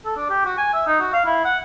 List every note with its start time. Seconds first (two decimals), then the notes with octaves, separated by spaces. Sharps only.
0.05 A4
0.17 D4
0.29 G4
0.45 F#4
0.58 G#5
0.73 E5
0.87 D#4
1.00 F#4
1.13 F5
1.26 E4
1.45 F#5